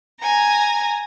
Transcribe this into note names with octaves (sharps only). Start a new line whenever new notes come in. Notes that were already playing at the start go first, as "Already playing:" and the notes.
G#5 A#5